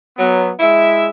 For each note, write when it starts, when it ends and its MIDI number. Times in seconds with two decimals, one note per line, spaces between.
0.17 0.49 54
0.17 0.49 59
0.60 1.06 56
0.60 1.06 64
0.60 1.06 76